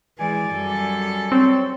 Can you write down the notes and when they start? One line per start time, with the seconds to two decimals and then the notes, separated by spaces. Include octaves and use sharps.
0.19 E3 G#3 D5 G#5
0.52 F#2 G3 A4
1.32 C4 C#5